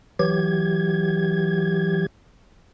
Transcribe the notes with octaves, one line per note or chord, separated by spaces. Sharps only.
E3 F#3 G4 G#6